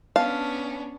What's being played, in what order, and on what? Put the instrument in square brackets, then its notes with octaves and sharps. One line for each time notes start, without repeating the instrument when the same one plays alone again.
[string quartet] B3 C#4 D4 [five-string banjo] F5 A5